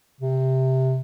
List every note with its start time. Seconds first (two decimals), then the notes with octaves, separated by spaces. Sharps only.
0.21 C3